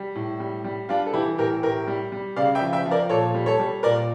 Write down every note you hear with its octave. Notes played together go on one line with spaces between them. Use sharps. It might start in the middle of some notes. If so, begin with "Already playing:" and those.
Already playing: G3
A2
G3
G3
G3 D4 F4
A4
E3 E4 G4
A2 G4 A#4
A2 G4 A#4
G3
G3
C#3 D5 F5
E5 G5
F3
E5 G5
F3
A#4 D5
A#2 A4 C#5
G3
A4 C#5
G3
A#2 A#4 D5